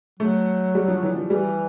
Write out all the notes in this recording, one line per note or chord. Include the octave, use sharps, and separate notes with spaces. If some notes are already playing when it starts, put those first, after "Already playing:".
F#3 A3
G3
F3
E3
F3
E3 G3